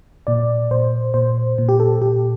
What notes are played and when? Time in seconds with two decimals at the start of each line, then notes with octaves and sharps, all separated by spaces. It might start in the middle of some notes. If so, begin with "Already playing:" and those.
0.27 A#2 D5
0.71 A#2 C5
1.14 A#2 C5
1.58 A#2
1.69 G4
1.80 A4
2.01 A#2 G4